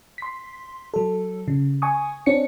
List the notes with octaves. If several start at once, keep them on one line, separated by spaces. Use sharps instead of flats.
C6 B6
F#3 A4
C#3
G#5 C#6 D#6
C4 D4 C#5 C#7